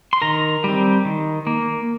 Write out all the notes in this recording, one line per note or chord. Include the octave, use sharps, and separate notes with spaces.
C6
D#3 A#4 A#5
G3 C4
D#3
A#3